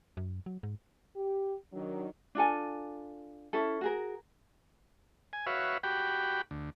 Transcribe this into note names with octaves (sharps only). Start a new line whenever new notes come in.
F#2
F#3
G#2
G4
D#3 F#3 D4
D4 F4 A4 G#5
C#4 E4 A4
F#4 G#4 A#4
G#5
F#4 B4 C#5 E5 F5
F#4 G4 G5 B5
D2